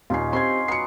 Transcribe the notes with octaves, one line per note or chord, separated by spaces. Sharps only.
D#2 A#2 C#4 D#4 F4 C7
C4 G4 C6 G#6
F#3 B3 C7 C#7